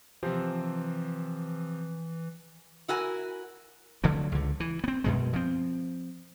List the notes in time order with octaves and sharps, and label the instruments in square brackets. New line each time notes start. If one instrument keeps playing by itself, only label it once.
[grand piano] C3 F3 C4 [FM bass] E3
[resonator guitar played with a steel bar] E4 F#4 A#4 G#5
[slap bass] D3 F3 F#3 A3
C#2 D3
E3
B3 C4
F#2 B2 G#3
F3 C4